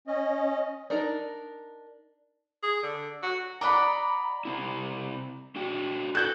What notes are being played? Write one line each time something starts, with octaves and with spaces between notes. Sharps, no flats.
C#4 D#5
D4 D#4 A#4
G#4
D3
F#4
D5 D#5 F#5 A#5 B5
C3 C4 E4
D4 F#4 G5
B3 F#4 A4 F#6 G6